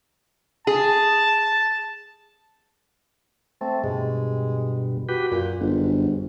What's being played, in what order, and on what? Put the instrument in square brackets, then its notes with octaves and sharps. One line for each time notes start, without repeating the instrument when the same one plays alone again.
[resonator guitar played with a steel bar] G#4 [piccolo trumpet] A5
[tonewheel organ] A3 [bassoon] C4
[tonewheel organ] G2 B2 [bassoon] G#3
[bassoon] F#4 [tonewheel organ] G4 B4
[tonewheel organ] F#2 [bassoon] A#2
[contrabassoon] G1 [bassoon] G#2